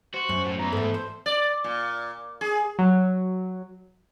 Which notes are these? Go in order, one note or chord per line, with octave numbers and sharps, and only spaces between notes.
F#4 C5
F#2
A2
E2 E3 A#5
G#2 A3 A4
C5
D5
A#2
G#4
F#3